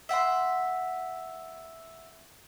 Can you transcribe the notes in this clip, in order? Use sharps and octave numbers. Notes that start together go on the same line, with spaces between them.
E5 F#5 G5 C6